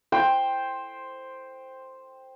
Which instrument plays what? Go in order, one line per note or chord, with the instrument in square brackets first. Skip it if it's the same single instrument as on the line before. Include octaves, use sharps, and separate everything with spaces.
[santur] C5 G5